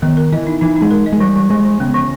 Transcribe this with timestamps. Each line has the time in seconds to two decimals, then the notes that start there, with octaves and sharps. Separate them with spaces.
0.02 D#3 B3
0.17 A#4
0.32 E3 D#5
0.47 D#4
0.61 E3 D#4
0.76 D#4
0.82 G#3
0.91 A#4
1.06 D#5
1.13 G#3
1.20 E3 G3
1.36 E3
1.50 E3 G#3
1.64 E3
1.80 C#3 B3
1.94 E3